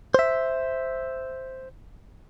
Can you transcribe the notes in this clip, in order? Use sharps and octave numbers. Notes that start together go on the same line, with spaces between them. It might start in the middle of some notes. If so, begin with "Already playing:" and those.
C5 E5